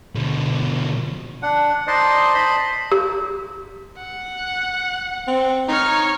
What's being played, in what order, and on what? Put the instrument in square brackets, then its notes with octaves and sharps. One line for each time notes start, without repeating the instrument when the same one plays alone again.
[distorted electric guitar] B2 D3
[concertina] D4 F#5
D#4 C5 D5 D#5 A5 C6
C5 D#5 A5 B5
[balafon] G4
[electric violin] F#5
[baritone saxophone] C4
[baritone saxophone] D#4 [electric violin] C#5 F6